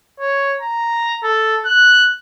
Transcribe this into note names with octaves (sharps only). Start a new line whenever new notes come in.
C#5
A#5
A4
F#6